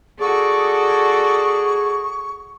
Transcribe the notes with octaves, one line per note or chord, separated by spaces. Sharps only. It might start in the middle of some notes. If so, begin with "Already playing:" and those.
F#4 G#4 A4 D5 C#6